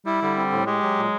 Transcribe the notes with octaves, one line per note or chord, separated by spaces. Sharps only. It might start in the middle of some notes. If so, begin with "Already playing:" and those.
G3 E4
D3 G3
C4
A2
G#3 G4
F#3
A#2